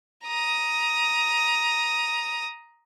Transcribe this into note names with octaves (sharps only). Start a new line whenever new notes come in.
A#5 D#6